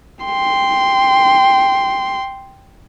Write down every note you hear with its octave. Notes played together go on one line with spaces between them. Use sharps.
G5 C6